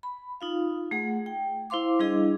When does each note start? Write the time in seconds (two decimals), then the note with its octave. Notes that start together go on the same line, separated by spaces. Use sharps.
0.03 B5
0.41 D#4 F4 F5
0.91 A3 G#4 F#5
1.26 G5
1.70 E4 C5 F5 C6 D6
1.99 G3 D4 E4 G#4 D#5